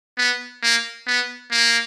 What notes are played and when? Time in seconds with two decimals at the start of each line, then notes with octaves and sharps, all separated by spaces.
0.18 B3
0.63 A#3
1.07 B3
1.51 A#3